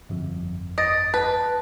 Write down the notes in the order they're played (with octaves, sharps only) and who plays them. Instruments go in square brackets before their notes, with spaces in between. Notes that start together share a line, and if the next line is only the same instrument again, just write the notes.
[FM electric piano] G1 F2
[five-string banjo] D#5 [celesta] A6 A#6 D7
[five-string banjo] B4 [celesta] A5